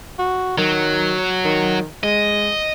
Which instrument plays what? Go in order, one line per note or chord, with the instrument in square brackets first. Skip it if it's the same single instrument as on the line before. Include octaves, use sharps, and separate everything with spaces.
[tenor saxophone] F#4
[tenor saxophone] D#3 [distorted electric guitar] F#3
[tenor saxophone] D#3
[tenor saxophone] G#3 [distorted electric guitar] D#5